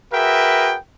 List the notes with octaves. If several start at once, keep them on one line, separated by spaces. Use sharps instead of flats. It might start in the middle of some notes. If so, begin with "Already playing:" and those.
F#4 G#4 A#4 B4 E5 G5